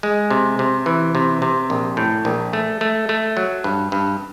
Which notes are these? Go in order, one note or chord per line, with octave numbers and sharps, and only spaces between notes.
G#3
C3
C3
E3
C3
C3
A#1
A2
A#1
A3
A3
A3
F#3
G2
G2